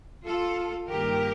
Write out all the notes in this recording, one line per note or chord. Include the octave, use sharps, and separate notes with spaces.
F4 A4
G2 D#3 G3 A#3 G4 A#4